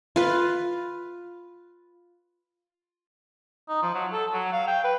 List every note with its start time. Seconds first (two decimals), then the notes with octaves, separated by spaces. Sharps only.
0.16 F4 B4
3.69 D#4
3.82 F3
3.94 F#3
4.12 A4
4.33 F#3
4.52 F5
4.68 G5
4.84 B4